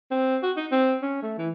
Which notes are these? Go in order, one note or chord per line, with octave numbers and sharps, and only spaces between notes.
C4
F#4
D#4
C4
C#4
A3
E3